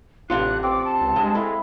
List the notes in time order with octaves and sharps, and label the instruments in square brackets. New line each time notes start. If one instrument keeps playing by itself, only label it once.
[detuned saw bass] A1 [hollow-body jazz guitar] C3 D4 F4 [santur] F#5 [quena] F#6
[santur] C4 [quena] D6
[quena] A5
[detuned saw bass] C#2
[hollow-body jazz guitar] G2 [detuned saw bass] G#3
[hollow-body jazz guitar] A3 [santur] E4 F5